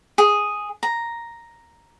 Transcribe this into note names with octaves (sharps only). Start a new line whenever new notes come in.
G#4
A#5